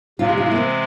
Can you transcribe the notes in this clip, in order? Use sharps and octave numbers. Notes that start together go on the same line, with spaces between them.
C3 E3 G#3 F4
G4
F4
E4
A#3
C4